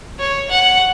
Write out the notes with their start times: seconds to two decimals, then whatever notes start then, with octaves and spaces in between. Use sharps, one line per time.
0.19 C#5
0.50 F#5